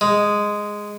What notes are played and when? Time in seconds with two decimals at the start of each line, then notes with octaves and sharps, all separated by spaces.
0.01 G#3